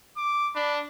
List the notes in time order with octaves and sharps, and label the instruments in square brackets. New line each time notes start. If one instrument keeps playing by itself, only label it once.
[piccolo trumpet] D6
[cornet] D4 [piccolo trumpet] B5